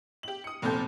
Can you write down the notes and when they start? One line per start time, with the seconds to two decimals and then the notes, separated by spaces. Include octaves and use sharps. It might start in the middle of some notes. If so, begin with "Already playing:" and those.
0.23 G4 F#7
0.44 D#6 C#7
0.62 F1 A#2 C4 A4 G6